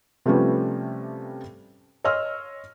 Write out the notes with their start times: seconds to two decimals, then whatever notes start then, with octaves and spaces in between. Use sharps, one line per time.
0.26 C3 F3 G3 A3 B3 C#4
2.04 C#5 D#5 C6 E6 F6